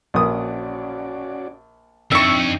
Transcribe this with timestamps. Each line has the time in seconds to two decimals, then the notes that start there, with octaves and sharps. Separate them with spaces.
0.14 A#1 C#4 F#4 D5 D#6
2.12 F2 D4 D#4 E5 G5 C#6